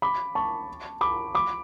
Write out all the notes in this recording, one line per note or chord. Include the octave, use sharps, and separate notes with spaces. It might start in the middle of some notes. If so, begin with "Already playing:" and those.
B5 D6
A5 C#6
B5 D6
B5 D6